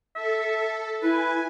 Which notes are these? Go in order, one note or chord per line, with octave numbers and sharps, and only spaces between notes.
A4 E5
E4 B4 G#5